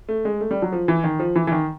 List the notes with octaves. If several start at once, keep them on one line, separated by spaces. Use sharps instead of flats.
A3
G#3
A3
G3
F#3
F3
E3
D#3
F3
E3
E3
D#3